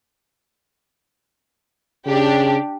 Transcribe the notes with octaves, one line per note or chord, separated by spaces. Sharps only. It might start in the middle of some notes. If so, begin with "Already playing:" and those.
C#3 D4 G4